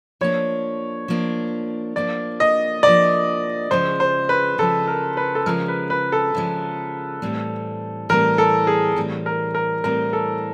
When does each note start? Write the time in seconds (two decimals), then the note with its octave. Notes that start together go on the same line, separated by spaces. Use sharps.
0.21 F3 A#3 D4 C#5
1.08 F3 A#3 D4
1.96 F3 A#3 D4 D5
2.40 D#5
2.83 F3 A#3 D4 D5
3.71 C#3 F3 G#3 C5
4.00 C5
4.29 B4
4.58 C#3 F3 G#3 A4
4.88 A#4
5.17 B4
5.35 A4
5.46 C#3 F3 G#3 A#4
5.68 B4
5.90 B4
6.12 A4
6.35 C#3 F3 G#3
7.22 A2 E3 G3 C4
8.09 A2 E3 G3 C4 A#4
8.38 A4
8.67 G#4
8.96 A2 E3 G3 C4
9.26 A#4
9.55 A#4
9.84 A2 E3 G3 C4 A#4
10.13 A4